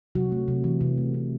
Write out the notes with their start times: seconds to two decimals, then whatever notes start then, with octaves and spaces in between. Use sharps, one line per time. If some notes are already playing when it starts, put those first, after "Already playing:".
0.15 C3 F#3 F#4
0.32 A3
0.48 C3
0.64 E3
0.81 C3
0.98 A3
1.14 C3